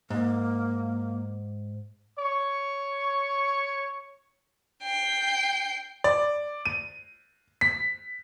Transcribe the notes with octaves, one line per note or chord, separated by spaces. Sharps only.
G#2 A#3
C#5 C#6
G5 C7
D5
D#7
B6